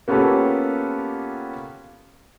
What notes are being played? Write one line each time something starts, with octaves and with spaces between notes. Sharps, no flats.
A#3 B3 C#4 F4 G4 A4